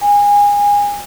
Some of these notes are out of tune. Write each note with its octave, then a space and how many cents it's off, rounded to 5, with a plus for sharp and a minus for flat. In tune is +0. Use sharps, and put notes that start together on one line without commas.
G#5 -25